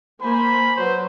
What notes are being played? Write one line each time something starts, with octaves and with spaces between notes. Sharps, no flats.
A#3 C5 G#5 B5
F#3 B4 C5